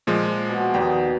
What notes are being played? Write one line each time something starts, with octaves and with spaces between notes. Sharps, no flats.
A#2 F3 G#3
B2 C#6
D#2 D#4 D5 F#5 G5